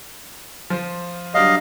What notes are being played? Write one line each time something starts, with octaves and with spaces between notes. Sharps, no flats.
F3 C5
F#3 G3 D4 D#5 F5